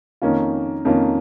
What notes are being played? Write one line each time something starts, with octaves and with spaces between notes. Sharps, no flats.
F2 D#3 A#3 C#4 F4
F2 D#3 A#3 C#4 F4